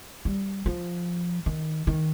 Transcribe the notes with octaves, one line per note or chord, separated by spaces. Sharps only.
G3
F3
D#3
D#3